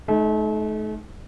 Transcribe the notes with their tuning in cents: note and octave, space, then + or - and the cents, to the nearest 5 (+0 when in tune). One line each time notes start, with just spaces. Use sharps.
A3 -40 D#4 +0